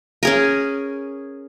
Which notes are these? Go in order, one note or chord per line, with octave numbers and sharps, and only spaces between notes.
C#4 G#4 A#4